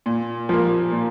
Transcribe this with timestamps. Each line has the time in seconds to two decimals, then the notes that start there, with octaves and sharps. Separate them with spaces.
0.06 A#2
0.49 F3 A#3
0.92 A#2